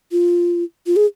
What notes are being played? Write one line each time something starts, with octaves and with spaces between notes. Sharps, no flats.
F4
F4
G#4